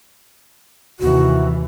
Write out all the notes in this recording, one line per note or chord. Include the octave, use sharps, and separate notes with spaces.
D#2 C3 E3 F#4